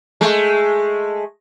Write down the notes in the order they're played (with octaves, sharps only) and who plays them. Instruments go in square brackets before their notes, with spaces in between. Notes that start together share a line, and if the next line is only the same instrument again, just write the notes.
[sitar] G#3 A3